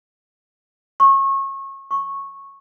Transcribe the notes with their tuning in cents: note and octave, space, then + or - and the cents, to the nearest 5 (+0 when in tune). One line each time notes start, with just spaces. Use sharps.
C#6 -30
C#6 -10